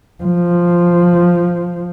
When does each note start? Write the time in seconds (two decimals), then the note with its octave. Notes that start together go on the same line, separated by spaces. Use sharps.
0.24 F3